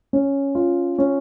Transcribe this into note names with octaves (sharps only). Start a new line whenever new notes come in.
C#4
F4
C#4